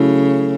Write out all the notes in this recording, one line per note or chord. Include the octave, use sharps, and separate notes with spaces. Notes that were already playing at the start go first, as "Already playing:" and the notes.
Already playing: C#3 F#3 A3 E4 A4